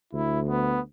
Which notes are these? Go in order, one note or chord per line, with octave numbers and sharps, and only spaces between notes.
D2 E4
B3